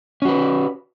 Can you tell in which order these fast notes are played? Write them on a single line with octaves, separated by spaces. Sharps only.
C#4 F#4 B4